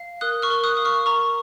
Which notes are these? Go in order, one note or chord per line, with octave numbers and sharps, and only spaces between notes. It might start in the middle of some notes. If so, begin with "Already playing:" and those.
Already playing: F5
A#4 D#6 F#6
C#6 F6
A#4
D#6 F#6
F5 D#6
C#6 F6
A#4 A#5 C#6